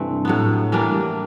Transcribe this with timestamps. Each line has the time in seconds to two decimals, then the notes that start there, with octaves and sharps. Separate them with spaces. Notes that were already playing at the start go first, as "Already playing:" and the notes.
Already playing: G2 C3 E3 A3 C4
0.25 A2 F#3 B3
0.72 E3 G3 A#3 D4